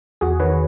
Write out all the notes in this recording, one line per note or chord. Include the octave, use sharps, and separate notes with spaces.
E2 F#4 G#4
D#3 B4 C#5